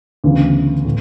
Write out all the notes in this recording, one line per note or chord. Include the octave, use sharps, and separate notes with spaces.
D2 C#3 E3 B3
A2